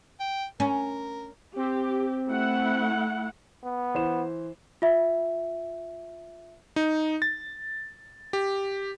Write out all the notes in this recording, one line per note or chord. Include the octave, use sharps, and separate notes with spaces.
G5
C#4 A#4
C4 G4
A3 E4 F#5
B3
E3 C5 E7
F4 E5
D#4
A6
G4